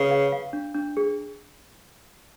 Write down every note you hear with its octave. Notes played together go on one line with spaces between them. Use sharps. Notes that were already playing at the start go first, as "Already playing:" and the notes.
Already playing: C#3 B4
F5
F5
D4
D4
G#4